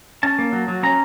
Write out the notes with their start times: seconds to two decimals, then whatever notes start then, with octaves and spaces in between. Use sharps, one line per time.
0.23 C#4 A5
0.39 A#3
0.53 F#3
0.68 F#3
0.83 C#4 A#5